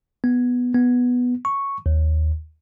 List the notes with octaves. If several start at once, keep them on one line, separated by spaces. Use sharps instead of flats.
B3
B3
C#6
D#2